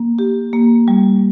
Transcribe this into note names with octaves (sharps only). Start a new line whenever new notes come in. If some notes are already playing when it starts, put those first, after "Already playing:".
Already playing: A#3
G4
A#3
G3